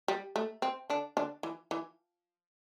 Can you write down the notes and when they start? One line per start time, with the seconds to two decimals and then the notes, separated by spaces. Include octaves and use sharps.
0.08 G3
0.36 A3
0.62 C4
0.90 D3 D4
1.17 D3 D4
1.43 E3
1.71 E3